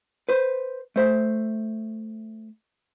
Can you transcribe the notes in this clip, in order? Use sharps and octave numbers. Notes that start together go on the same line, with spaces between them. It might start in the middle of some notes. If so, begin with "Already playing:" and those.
B4 C5
A3 C5 E5